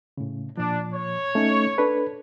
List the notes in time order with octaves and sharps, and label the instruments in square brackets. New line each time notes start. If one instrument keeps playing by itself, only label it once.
[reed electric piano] A2 C#3
[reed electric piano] A#2 F3 [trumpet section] D4
[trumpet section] C#5
[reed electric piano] A3 C#4 D#4
D4 A4 B4